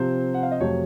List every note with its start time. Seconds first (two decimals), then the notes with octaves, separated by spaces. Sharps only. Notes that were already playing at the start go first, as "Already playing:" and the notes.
Already playing: C3 F3 C4 C5
0.34 F#5
0.43 F5
0.51 D#5
0.60 F2 C3 F#3 A3 C#5